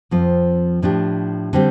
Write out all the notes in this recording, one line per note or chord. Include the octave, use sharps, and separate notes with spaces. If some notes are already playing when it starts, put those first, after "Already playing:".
F2 F3 C4 F4
A2 F3 D4 G4
D3 G3 C4 G4